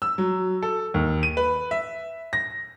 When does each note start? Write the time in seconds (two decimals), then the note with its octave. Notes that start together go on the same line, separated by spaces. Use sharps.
0.02 E6
0.18 F#3
0.62 A4
0.94 D#2
1.23 D#7
1.37 B4
1.71 E5
2.33 A#6